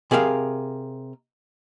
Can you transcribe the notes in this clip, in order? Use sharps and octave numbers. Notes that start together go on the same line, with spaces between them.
C3 G#4 A#4 E5 F5